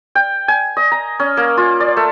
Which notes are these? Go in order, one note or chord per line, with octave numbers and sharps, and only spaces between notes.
G5
G#5
D#5
A#5
C#4
A#3
F4
D5
A3